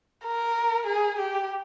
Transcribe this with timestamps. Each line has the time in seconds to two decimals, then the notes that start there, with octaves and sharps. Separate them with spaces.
0.24 A#4
0.87 G#4
1.19 G4